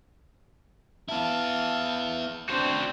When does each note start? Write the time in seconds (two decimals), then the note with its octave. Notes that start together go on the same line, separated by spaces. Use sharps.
1.09 B3 E4 F5 A5
2.49 C4 D4 F#4 C5